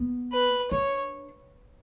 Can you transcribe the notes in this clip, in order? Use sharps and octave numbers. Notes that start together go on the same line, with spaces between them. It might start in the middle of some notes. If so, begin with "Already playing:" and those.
Already playing: B3
B4
D4 C#5